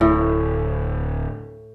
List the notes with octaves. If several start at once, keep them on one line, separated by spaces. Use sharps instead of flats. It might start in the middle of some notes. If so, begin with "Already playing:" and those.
D1 A2